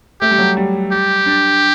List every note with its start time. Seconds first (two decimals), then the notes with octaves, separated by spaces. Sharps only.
0.21 A3 G4
0.31 G3
0.38 F#3
0.57 G3
0.92 G4
1.26 D4